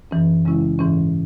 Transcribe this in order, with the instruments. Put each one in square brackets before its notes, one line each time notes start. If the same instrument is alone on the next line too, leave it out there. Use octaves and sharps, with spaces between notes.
[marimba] F#2 E3 C#4
C#3 G#3 C#4 E4
G#2 E3 C#4